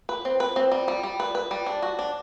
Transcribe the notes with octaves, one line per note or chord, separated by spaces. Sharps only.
B4
C4
B4
C4
G3
G3
G3
B4
B4
G3
D4
F#4
D4